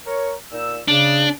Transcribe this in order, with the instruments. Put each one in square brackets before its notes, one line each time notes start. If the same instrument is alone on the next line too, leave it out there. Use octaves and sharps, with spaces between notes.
[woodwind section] A#4 C#5
A#2 D#4 E6
[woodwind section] C#3 [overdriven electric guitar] D4